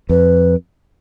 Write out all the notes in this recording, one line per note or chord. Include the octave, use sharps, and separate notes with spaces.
F2 B4